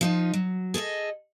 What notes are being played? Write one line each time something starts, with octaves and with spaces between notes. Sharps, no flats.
F3 D#4 F4
F#3
G#4 A4 C5 D#5